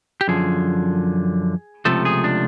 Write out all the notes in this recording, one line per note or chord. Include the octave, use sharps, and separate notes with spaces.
G4
F#2 D3 F3 G#4
C#2 C3 F3 A3 A4
G#4
D4